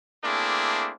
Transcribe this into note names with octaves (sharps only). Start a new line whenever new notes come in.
A3 A#3 C4 D4 E4 G#4